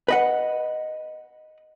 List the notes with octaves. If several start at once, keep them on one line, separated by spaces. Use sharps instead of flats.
B4 D#5 F#5